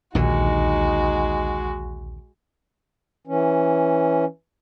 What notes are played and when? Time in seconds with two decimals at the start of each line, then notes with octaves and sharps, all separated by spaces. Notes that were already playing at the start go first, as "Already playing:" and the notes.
0.15 A#1 D#2 A#2 D3 G#3 D#4 F#4
3.27 E3 C#4